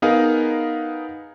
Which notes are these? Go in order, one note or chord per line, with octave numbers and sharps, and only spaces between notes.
B3 D#4 G#4 A#4 F5